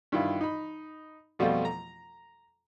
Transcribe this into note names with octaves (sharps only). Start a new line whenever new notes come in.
G2 D#3 E4 F4
D#4 B5
F2 B2 F3 G3 A3 F4
A#5